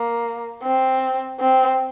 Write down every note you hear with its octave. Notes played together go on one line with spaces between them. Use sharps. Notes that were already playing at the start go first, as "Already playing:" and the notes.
Already playing: A#3
C4
C4